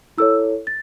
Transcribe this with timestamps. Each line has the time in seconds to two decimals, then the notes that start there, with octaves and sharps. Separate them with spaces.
0.18 E4 A4 C#5 E6
0.67 A6